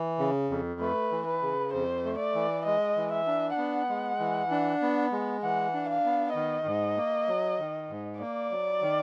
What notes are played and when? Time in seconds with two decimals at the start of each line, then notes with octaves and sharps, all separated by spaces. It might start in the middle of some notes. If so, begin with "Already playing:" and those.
Already playing: E3
0.19 C#3
0.50 F2
0.80 A3 B4
1.11 E3
1.27 B4
1.42 C#3
1.73 F2 C5
2.04 A3
2.19 D5
2.35 E3
2.65 G#3 D#5
2.96 E3
3.12 E5
3.27 D4
3.58 B3 F#5
3.89 G#3
4.19 E3
4.51 D4
4.82 B3
5.12 G#3
5.42 E3 F#5
5.74 D4
5.89 F5
6.05 B3
6.35 D#3 D#5
6.66 G#2
6.97 A#3
7.28 F#3
7.59 D#3
7.90 G#2
8.21 A#3 D5
8.51 F#3
8.82 D#3